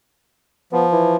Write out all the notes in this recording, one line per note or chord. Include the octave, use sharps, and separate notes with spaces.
F3 B3
E3